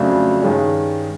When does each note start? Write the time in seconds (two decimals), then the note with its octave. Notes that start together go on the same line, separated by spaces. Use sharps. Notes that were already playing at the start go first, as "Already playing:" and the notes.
Already playing: F2 C#3 F#3 A3 D4
0.42 G2 D#3 G#3 C#4